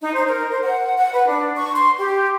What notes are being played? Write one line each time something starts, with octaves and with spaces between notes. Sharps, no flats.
D#4
C5
A#4
C5
F#5
F#5
B4
D4
C#6
C6
G4